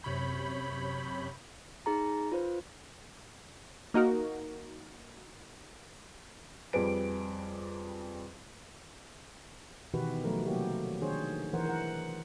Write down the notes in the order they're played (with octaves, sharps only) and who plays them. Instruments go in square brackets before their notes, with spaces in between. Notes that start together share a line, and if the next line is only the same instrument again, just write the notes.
[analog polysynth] F#2 C3 C#5 B5 G6
[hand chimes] D#4 G#4 A#5
F4 B4 C5
[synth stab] A#3 D#4 F#4 A#4
[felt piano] F2 G3 G#4 B4 D7
[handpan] B2 D#3 E3 F#4 G4 B4
F3 F#3 A3 A#4
C3 F#3 A#3 F#4 G4
D#3 D4 G#4 C5 C#5
E3 A#4 C5 F#5
A#4 F#5